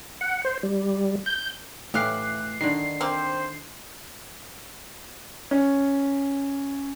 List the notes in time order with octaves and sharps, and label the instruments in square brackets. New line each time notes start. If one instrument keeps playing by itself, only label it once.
[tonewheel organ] F#5
C5
G3
G6
[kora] A2 E3 [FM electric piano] A3 F#6 C7 [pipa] G4 F5
[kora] D3 D#3 [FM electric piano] C7
[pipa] A#3 C4 [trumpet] C5
[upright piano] C#4